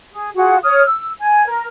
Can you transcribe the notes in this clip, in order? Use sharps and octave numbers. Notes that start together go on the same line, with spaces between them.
G#4
F4 F#4 G#4 F#5
C#5 D#6 F6
E6
G#5 G#6
A#4